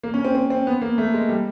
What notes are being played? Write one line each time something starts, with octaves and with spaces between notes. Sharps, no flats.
A#3
C#4
C4
C4
C4
B3
A#3
A3
G#3
G3